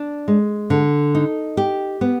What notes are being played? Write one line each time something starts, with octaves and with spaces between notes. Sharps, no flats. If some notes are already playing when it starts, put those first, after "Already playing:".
Already playing: D4
G#3
D3
D#4
G4
B3